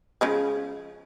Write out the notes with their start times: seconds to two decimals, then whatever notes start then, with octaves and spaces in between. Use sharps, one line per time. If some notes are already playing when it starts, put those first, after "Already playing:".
0.21 C#3 F3 G#3